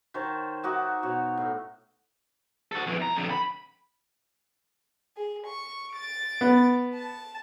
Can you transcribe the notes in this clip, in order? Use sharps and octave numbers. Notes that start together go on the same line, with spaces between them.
D#3 C5 C#5 A5
D#4 F#4 E5 D6
B2 F#4 C#5
A2
F#4 A4
F2 E3
C2 A#5
F2 D3
B5
G#4
C#6
A6 D7
B3
A5